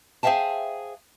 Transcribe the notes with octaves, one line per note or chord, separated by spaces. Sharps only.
G#4 C5 E5 F5 G5 A5